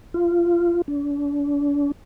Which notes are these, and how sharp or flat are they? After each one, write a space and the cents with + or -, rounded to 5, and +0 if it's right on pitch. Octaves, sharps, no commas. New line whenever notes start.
F4 -20
D4 -40